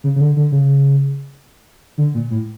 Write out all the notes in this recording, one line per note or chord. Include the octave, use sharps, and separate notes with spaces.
C#3
C#3
D3
D3
C#3
D3
A#2
A2